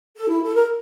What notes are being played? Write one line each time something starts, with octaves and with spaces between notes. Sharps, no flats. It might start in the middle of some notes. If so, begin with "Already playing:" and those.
A4
E4
A4
A#4